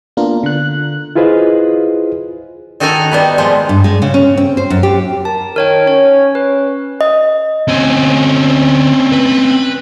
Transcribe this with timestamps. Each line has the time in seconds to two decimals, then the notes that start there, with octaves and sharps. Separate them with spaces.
0.17 A#3 B3 D4 F4 A#4
0.43 D3 F#6
1.15 E4 F4 G#4 B4 C5 D#5
2.80 D#3 D#4 F#4 A4 G#5 A#5
3.12 G3 B3 B4
3.38 A#2 F3 G#3
3.69 G2
3.84 G#3
4.02 C#3
4.14 C#4
4.37 C4
4.57 C5
4.70 F#2
4.83 G4
5.25 A#4 A5
5.56 D#3 A#4 C#5 G5
5.87 C#4 C#5
6.35 B4
7.01 D#5
7.68 D2 C4 C#4 G#5
9.12 B4